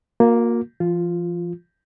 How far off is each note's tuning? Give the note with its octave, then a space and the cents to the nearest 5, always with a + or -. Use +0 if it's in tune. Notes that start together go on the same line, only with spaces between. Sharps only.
A#3 +0 F#4 -45
F3 -40 F4 +0